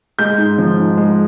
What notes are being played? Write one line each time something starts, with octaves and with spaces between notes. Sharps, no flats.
G#3 G6
G#2
F3
G#2
G#3